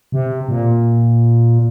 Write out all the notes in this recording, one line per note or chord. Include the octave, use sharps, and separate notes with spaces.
C3
A#2